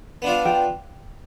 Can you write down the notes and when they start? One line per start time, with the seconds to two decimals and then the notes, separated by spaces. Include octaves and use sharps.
0.22 B3 D4 F4
0.45 G5